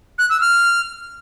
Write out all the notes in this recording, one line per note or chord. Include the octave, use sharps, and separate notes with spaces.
F#6
E6
F6